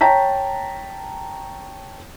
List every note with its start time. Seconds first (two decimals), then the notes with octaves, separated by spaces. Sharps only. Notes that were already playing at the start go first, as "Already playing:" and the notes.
0.01 C#5 G5 A5 A#5 B6